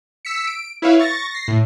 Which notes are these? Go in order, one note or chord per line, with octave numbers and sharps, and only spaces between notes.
E6 B6 C#7
D7
E4 B4 C#5 E5 F5
C#6 A6 A#6
A#6 C7
A2